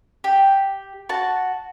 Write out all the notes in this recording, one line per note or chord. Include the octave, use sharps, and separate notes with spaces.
G4
F#4 A5